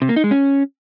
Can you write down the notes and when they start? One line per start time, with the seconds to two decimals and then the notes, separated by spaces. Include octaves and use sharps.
0.02 C3
0.09 A#3
0.16 D#4
0.24 G#3
0.31 C#4